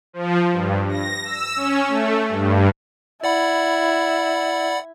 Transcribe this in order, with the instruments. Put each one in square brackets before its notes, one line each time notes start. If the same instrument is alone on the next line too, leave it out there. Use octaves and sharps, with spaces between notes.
[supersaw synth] F3
G2
A#6
E6
C#4
A3
G2
[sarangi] E4 [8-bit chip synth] D5 F#5 B5